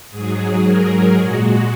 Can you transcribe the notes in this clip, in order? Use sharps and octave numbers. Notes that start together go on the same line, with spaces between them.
G#2 F#3 G#4
A#4
A#2 G#3 F#4